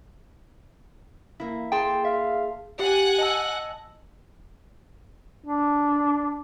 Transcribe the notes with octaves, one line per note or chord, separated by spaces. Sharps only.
A#3 E4
G#4 G5 A5 C6
E5 F5
G4 F#5 G#5 F#6
D#5 A5 E6
D4